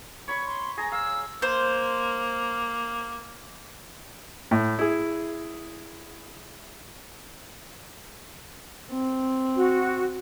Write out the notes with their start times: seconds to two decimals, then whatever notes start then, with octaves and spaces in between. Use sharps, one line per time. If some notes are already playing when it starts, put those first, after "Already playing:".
0.28 C#5 B5 C#6
0.46 C6
0.77 G#4 A#5 A#6
0.92 F5 E6
1.42 A#3 C5
4.51 A2
4.79 E4 G#4
8.90 C4
9.55 F#4